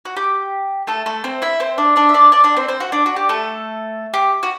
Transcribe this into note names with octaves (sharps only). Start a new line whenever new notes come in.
F#4
G4
A3 A4
A3 A4
C4 C5
E4 E5
C4 C5
D4 D5
D4 D5
E5
D4 D5
D4 D5
D4 D5
C4 C5
C4 C5
F#4
D4
F#4
G4
A3 A4
G4
F#4